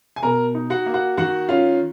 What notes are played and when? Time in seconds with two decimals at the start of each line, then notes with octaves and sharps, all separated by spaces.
0.16 G#5
0.23 B2 A#4 A#5
0.54 D#4
0.70 F#4 F#5
0.86 A#3
0.94 F#4 F#5
1.17 D#3 F#4 F#5
1.49 C#4 F4 F5